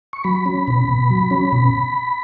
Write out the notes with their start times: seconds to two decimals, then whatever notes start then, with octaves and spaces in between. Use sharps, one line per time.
0.13 C#6
0.24 F#3 B5
0.46 C#4
0.68 B2
0.88 B2
1.10 F#3
1.31 C#4
1.52 B2